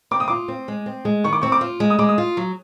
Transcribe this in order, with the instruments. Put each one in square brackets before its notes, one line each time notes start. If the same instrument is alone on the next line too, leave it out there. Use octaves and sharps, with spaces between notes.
[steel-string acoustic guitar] C4 [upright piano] D6
[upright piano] D#6
[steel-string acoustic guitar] F4 [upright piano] D6
[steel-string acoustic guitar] C4
G#3
C4
G#3
[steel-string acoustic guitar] D#3 [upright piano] C#6
[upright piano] D6
[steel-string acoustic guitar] C4 [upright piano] C#6
[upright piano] D6
[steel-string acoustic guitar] F4
G#3
[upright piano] D#6
[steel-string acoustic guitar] G#3 [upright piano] D6
[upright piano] D#6
[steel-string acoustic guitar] F4
F#3